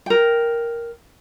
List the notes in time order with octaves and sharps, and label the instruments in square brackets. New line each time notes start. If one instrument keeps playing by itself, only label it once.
[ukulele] A#4 G5